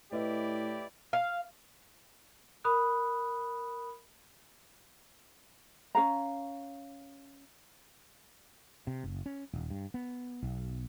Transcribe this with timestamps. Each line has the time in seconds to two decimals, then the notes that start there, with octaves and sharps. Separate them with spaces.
0.12 A2 E4 G4 B4 D5 D#5
1.13 F5
2.64 A#4 B5 D#6 F#6
5.95 C#4 A#4 F5 A#5
8.87 C3
9.04 F#1
9.26 C#4
9.53 D#1
9.70 G2
9.94 B3
10.43 B1